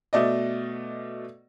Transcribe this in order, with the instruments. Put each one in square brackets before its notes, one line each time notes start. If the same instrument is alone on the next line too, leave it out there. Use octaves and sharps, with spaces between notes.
[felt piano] B2 A3 D5 D#5